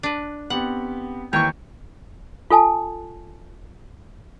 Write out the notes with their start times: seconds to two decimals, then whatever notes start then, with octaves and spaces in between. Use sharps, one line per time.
0.03 D4 B4
0.50 B3 C4 G4 F#5
1.33 D#2 E3 C#5 G5 C#6
2.50 F4 A4 G#5 A5